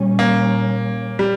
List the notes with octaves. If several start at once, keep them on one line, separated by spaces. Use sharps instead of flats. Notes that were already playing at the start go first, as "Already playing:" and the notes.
Already playing: A#2 G3 C#4
A#3
G3